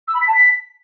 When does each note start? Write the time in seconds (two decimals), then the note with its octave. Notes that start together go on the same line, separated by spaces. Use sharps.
0.07 E6
0.14 B5
0.20 B6
0.27 A5
0.34 B6